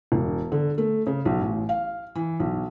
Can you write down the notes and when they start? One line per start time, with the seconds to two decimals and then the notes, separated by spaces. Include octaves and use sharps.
0.12 E1
0.52 D3
0.78 A3
1.07 C#3
1.25 B1
1.41 A1
1.69 F5
2.15 E3
2.40 B1